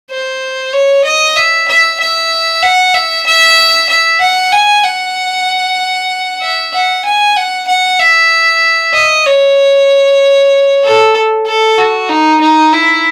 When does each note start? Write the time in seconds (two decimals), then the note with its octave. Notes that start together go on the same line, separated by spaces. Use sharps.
0.10 C5
0.73 C#5
1.04 D#5
1.36 E5
1.68 E5
2.00 E5
2.63 F#5
2.94 E5
3.26 E5
3.89 E5
4.21 F#5
4.53 G#5
4.84 F#5
6.42 E5
6.73 F#5
7.05 G#5
7.36 F#5
7.67 F#5
8.00 E5
8.93 D#5
9.26 C#5
10.84 A4
11.47 A4
11.78 F#4
12.09 D#4
12.41 D#4
12.73 E4